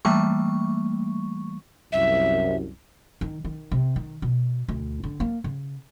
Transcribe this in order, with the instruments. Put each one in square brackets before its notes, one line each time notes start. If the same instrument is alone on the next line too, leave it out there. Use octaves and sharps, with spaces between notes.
[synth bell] E3 G3 A3 A#3 C#6
[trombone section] C2 F#2 [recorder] E5
[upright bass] D#3
D#3
C3
D#3
B2
D2
D3
A#3
C#3